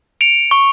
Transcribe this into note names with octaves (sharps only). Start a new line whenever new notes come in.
C#7 D7 F7
C#6